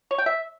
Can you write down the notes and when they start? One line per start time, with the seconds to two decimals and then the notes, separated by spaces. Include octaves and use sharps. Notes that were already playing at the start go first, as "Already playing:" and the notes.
0.11 C#5
0.18 G5
0.26 E5